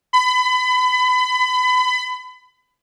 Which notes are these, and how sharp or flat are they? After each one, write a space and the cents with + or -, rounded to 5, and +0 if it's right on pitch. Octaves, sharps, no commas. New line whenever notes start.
B5 +30